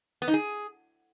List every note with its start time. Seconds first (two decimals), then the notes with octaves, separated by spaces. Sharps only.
0.22 B3
0.28 D#4
0.34 G#4